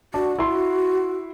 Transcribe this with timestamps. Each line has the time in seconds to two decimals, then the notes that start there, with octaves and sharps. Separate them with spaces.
0.14 D4 F#4
0.39 E4 C6